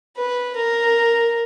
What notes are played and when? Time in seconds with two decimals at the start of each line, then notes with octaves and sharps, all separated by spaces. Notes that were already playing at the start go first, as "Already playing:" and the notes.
0.17 B4
0.56 A#4